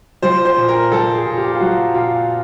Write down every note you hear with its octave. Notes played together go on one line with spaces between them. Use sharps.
F3 C5
C5
A#2
A#4
F3 A4
G#4
A#2
G4
F4
F3 F#4
A#2 F4